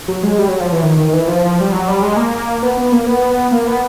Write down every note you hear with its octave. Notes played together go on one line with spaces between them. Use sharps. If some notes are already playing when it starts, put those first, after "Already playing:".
F#3
G#3
G3
F#3
F3
E3
D#3
D#3
E3
F3
G3
F#3
G3
G#3
A#3
B3
B3
A#3
B3
A#3
B3